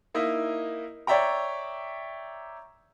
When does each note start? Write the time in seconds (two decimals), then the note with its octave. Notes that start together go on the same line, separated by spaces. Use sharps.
0.14 A#3 D#4 E4 D#5
1.07 C#5 D5 E5 G5 A#5